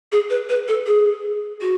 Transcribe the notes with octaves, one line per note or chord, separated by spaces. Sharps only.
G#4
B4
B4
A4
G#4
F#4